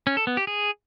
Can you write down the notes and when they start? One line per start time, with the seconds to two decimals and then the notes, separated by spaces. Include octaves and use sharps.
0.07 C#4
0.17 A4
0.27 B3
0.37 G4
0.47 G#4